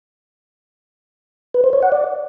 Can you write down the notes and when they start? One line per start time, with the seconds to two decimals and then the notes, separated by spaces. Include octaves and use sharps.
1.54 B4
1.64 C5
1.73 C#5
1.83 F#5
1.92 D5